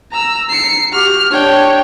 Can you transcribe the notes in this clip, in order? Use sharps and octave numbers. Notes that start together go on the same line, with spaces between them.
A#5 E6
C7 C#7
F#4 G4 F6
D4 C#5 G5